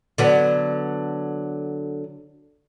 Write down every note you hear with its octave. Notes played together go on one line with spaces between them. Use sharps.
D3 F#3 B3